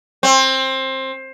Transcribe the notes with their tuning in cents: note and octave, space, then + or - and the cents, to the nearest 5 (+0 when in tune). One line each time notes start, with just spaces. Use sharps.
C4 +20